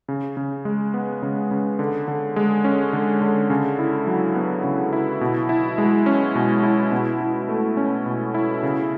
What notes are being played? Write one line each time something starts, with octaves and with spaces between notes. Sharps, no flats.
C#3
C#3
G#3
B3
C#3
C#3
D3
D3
G#3
C#4
D3
D3
C#3
E4
F#3
B3
C#3
E4
B2
E4
G#3
C#4
B2
E4
B2
E4
A3
C#4
B2
E4
C#3